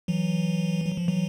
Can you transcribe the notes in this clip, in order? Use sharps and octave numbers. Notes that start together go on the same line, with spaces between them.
E3 F#3
F#3
F3
E3 F#3